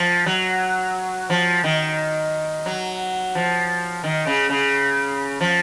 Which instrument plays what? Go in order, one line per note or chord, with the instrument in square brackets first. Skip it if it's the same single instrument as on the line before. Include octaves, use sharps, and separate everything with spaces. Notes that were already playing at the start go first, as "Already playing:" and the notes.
Already playing: [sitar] F3
F#3
F3
D#3
F#3
F3
D#3
C#3
C#3
F3